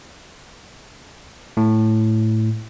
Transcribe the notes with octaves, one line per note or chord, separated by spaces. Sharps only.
A2